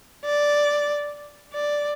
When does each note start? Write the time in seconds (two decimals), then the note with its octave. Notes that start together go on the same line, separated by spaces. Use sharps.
0.25 D5
1.53 D5